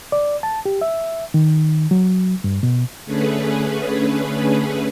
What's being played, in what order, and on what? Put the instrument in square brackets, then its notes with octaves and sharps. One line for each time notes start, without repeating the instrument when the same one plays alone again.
[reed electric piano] D5
A5
G4
E5
D#3
F#3
G2
B2
[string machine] D3 A3 C#4 G#4 B4